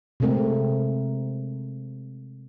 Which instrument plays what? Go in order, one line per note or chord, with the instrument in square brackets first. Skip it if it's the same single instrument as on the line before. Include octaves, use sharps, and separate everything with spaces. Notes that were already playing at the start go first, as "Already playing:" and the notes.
[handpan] C3 G#3 A3 C4 A#4